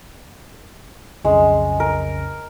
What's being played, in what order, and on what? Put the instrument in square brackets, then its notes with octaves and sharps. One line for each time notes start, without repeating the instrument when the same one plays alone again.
[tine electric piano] B1 F2 C#3 [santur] G#3
[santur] A#4